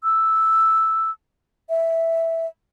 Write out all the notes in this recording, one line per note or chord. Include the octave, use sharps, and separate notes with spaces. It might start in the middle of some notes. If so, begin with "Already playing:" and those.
E6
E5